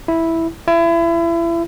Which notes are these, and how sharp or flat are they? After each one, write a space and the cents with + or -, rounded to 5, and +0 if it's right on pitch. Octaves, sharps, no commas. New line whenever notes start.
E4 -5
E4 +30